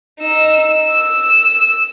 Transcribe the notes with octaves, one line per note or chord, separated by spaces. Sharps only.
D#4 E6
E6